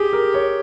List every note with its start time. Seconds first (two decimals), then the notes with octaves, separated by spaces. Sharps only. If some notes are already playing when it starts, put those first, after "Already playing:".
Already playing: G4 G#4
0.13 A#4
0.34 C#5